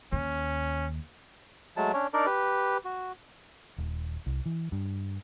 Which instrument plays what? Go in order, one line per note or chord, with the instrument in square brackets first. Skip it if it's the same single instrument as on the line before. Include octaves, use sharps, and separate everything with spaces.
[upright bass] D#2 [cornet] C#4
[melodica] F#3 G#3 A3 A5
C#4 D4 C#5
D4 D#4 A#4 D5
G4 B4
F#4
[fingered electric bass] D#1
C2
E3
G2